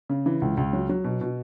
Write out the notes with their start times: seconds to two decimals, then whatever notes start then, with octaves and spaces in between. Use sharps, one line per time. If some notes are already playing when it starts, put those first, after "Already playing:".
0.09 C#3
0.26 E3
0.42 C#2
0.57 C#2
0.73 F#3
0.89 F#3
1.04 B2
1.21 B2